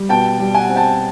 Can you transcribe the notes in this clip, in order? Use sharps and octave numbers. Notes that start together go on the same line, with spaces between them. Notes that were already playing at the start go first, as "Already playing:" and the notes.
Already playing: G3
B2 G5 A5
G3
F#5 G#5
C4
G5 A5